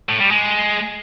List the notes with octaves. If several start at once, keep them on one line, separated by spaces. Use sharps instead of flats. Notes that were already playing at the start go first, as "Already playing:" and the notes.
A2
G3
G#3